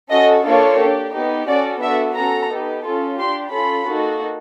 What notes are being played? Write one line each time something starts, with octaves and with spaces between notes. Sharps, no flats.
C#4 F#4 A4 D#5
A#3 D4 F4 A4 C#5
D4 G4
B3 D#4 G4
C#4 F#4 A4 D5
B3 D4 F#4 A4 E5
C#4 F#4 A4 A#5
B3 D#4 G4
C#4 F4 A4
D4 G4 C6
C#4 F4 A4 B5
A#3 D#4 F#4 A4